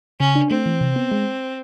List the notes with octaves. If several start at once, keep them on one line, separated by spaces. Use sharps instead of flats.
C#3 C#4
D4
A3 C4
E3
C3
B3
G#3